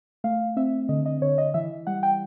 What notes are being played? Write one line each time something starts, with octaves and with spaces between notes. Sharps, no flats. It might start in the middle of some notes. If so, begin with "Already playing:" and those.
A3 F5
C4 E5
D3 D#5
D#5
D3 C#5
D#5
E3 E5
G3 F#5
G5